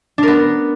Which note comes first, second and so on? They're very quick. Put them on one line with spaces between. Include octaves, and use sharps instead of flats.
D4 A#4 B3